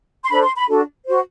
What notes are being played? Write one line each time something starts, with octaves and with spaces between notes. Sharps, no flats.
C6
D4 A4 C5 B5
C6
B5
D4 F#4 A4
F#4 C5